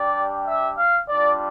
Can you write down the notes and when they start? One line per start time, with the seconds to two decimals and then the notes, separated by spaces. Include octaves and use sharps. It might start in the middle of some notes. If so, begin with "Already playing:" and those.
Already playing: G3 D4 G4 D5
0.44 E5
0.76 F5
1.08 G3 D4 F4 D5